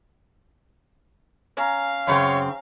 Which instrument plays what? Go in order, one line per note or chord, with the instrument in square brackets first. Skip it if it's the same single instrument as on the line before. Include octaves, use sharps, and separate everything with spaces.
[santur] C#4 A#5 [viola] F5
[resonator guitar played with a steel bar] F#2 C#3 C4 [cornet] C#5